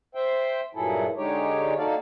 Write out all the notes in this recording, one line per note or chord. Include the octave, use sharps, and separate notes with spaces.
C5 E5 G5
G2 A#2 F#3 E4 G#4 A4
D3 G#3 D#4 G4 C#5
A#3 D#4 F#4 A4 D5 F5